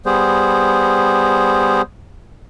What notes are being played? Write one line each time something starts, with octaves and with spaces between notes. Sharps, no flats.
G3 B3 G#4 C5